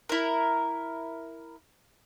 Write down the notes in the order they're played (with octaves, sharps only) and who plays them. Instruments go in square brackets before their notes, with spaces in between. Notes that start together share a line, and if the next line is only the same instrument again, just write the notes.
[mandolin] E4 A#4